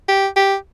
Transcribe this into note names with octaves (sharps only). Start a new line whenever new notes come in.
G4
G4